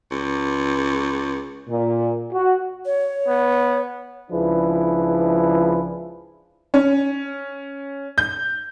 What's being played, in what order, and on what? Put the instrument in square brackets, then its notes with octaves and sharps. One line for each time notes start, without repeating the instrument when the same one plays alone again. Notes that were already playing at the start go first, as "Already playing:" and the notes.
[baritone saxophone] C#2
[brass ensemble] A#2
F#4
[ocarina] C#5
[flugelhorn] B3
[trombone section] C#2 F3 D4 E4 G#4 B4
[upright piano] C#4
G6